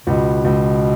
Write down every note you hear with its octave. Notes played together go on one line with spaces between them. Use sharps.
C#2 B2
C#2